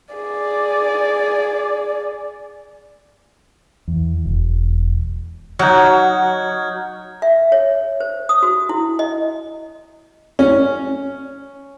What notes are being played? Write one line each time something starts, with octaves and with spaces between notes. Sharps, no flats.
G#4 D5
E2
E1
F#3 D#4 F#4 F6 G6 G#6
E5
C#5
C5
D#6
F#4
E4
D#5
C#4